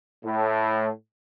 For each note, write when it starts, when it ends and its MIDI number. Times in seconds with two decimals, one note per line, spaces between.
0.23 0.88 45